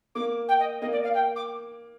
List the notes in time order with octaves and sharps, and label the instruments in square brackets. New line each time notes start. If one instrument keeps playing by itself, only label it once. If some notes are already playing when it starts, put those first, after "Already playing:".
[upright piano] A#3 [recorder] D6
[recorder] G5
D#5
[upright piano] A#3 [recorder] D#5
[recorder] D5
F5
G5
D6